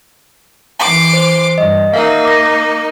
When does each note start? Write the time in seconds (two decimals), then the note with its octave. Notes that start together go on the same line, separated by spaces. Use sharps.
0.79 E3 C6 D6
1.13 C5
1.58 G2 D#5
1.94 A#3 D#4 A#4 E5 F5
2.25 D6 A#6